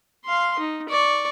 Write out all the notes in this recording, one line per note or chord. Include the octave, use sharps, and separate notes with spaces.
F5 C6
D#4
D5 C#6